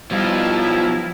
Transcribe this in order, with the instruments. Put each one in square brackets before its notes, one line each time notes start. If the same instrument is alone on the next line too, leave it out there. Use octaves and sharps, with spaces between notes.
[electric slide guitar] B2 D#4 [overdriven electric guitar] F3 [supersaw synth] G3 F5 A6 [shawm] E4